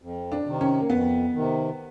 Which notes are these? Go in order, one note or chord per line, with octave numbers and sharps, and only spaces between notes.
F2
D4
C3 D#3
C#4
A#3
F2 B3
C3 D#3